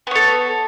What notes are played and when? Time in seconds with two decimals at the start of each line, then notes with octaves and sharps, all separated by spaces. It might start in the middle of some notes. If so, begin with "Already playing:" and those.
0.07 B3
0.11 C#5
0.15 A4